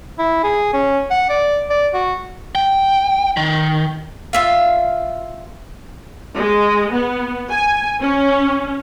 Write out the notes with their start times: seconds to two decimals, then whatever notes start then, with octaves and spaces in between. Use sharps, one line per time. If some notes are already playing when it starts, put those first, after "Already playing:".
0.19 E4
0.43 G#4
0.73 C#4
1.10 F#5
1.29 D5
1.70 D5
1.94 F#4
2.55 G5
3.37 D#3
4.33 F4 E5 F5
6.39 G#3
6.92 B3
7.51 G#5
8.00 C#4